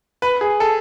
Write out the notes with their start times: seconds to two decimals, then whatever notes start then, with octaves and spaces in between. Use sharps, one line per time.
0.22 B4
0.41 G#4
0.60 A4